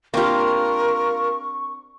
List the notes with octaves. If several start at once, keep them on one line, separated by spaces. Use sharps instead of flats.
A#3 C4 D4 F4 G4 A#4 C#6